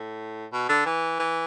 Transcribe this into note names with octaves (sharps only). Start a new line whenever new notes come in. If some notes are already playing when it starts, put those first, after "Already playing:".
Already playing: A2
B2
D3
E3
E3